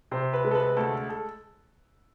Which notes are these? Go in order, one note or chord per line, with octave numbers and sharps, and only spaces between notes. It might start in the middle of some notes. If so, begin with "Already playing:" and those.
C3 C5
B4
G#3
A4
B4
D2 A4
A4